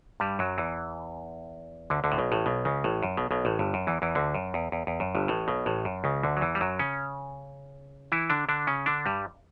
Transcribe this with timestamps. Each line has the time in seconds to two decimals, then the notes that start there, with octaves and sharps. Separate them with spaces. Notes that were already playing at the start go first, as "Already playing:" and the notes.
0.20 G2 G3
0.39 F#2 F#3
0.58 E2 E3
1.90 D2 D3
2.04 D2 D3
2.12 A2
2.18 B1 B2
2.32 A1 A2
2.46 B1 B2
2.65 C#2 C#3
2.84 A1 A2
3.03 F#2
3.17 B1 B2
3.31 B1 B2
3.45 A1 A2
3.59 G1 G2
3.74 F#2
3.87 E2 E3
4.02 E2 E3
4.15 D2 D3
4.35 F#2
4.54 E2
4.72 E2
4.87 E2
5.00 F#2
5.15 G1 G2
5.28 A1 A2
5.48 B1 B2
5.66 A1 A2
5.85 F#2
6.04 C#2 C#3
6.23 D2 D3
6.37 F#3
6.41 E2 E3
6.55 G3
6.61 F#2 F#3
6.79 C#3 C#4
8.12 E3 E4
8.30 D3 D4
8.49 D3 D4
8.67 C#3 C#4
8.86 D3 D4
9.06 G2 G3